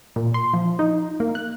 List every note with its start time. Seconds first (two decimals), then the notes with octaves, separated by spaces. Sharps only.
0.16 A#2
0.34 C6
0.53 F3
0.79 D#4
1.20 A#3
1.35 F#6